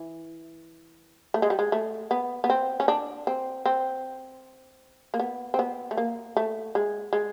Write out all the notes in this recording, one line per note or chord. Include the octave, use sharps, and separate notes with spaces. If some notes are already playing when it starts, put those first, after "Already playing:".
Already playing: E3
A3
G#3
G3
G#3
A3
B3
B3
C4
C#4
D4
C4
C4
A#3
B3
C4
B3
A3
A#3
A3
G#3
G#3